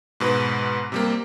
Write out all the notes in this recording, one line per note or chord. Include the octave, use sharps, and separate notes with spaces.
G#2 B2 B4
C3 G3 A#3